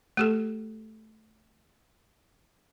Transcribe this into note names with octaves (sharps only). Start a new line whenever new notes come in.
A3 G4 A4